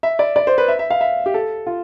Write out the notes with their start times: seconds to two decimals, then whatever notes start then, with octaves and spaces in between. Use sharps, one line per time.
0.03 E5
0.19 D5
0.36 D5
0.47 C5
0.58 B4
0.68 E5
0.79 E5
0.90 F5
1.01 E5
1.26 G4
1.34 A4
1.67 F4